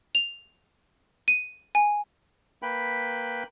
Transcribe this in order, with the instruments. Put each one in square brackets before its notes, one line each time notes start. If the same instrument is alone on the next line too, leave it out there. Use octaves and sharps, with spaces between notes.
[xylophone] F7
D#7
G#5
[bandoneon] A#3 B4 G5 B5